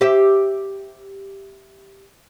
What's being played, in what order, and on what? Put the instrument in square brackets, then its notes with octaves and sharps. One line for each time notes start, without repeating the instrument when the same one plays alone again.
[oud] G4 C5 E5